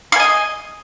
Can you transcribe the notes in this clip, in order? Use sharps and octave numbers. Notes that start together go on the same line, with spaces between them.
D#5 F5 G#5